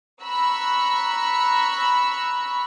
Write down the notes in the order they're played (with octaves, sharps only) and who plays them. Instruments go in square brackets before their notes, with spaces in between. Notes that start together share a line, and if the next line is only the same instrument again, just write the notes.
[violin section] A#5 B5 C#6 E6 F#6